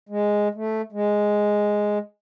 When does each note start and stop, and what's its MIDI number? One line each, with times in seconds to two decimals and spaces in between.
0.09 0.48 56
0.55 0.82 57
0.92 1.98 56